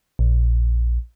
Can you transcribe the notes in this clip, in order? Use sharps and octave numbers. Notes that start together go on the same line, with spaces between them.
A#1